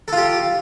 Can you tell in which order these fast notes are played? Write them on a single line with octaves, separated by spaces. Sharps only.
A4 F4 G4